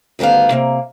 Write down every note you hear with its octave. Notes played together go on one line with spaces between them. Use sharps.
D2 D#3 G3 B3 F5
C3 A#3